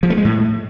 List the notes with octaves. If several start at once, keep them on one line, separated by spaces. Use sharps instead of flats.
F3
A3
G#3
A2